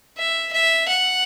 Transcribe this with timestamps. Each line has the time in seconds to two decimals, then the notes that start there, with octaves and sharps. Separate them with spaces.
0.18 E5
0.53 E5
0.88 F#5